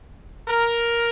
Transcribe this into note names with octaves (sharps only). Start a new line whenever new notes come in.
A#4